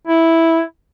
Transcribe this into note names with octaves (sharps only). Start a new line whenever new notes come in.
E4